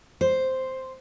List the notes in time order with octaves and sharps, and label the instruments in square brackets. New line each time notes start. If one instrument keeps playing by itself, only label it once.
[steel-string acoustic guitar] C5